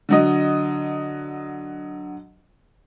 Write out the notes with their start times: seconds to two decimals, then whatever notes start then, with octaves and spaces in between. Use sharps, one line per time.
0.09 D3 F#3 D#5